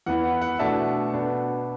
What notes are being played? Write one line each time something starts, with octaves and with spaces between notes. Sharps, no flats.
E2 E3 B3 E4 F#5
F#5
F#5
B2 A3 D4 E5 A5
B2 B3 D4